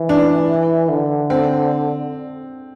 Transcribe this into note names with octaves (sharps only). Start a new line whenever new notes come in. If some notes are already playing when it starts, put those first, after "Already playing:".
Already playing: E3
D4
D3
C4